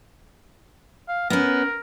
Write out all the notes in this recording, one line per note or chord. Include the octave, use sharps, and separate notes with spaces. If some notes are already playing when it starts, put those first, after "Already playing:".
F5
B3 C#4 A#4